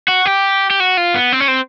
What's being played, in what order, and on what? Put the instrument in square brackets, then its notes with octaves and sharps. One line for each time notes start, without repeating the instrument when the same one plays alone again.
[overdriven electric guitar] F#4
G4
G4
F#4
F4
B3
C4
C#4
C4